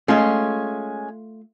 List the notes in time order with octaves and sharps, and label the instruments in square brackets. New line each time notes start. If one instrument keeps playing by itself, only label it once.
[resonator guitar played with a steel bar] G#3 C#4 [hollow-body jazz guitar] A3 F4